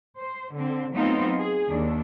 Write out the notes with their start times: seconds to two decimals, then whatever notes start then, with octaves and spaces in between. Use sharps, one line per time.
0.18 C5
0.53 D3 C4
0.94 F#3 A3 B3 C4 D#4 F4
1.39 G#4
1.68 D#2 D4